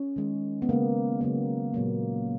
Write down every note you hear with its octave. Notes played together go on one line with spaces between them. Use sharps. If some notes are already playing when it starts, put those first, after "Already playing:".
Already playing: C#4
D#3 G#3
B3
C#3 G#3 A#3
C#3 F#3 A#3
A#2 F#3 A#3